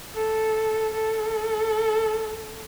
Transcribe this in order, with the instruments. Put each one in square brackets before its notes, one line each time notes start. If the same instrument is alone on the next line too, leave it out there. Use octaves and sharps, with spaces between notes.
[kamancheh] A4
A4